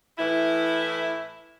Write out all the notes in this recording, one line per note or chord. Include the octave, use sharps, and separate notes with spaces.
A2 E3 E4